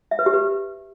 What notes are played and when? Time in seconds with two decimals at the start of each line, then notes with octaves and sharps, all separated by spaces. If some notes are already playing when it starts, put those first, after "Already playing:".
0.11 E5
0.19 B4
0.26 G4
0.34 B4